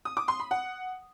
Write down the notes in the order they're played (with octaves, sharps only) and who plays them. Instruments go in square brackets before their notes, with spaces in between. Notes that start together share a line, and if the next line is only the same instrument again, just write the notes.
[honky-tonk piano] D#6
D6
C6
B5
F#5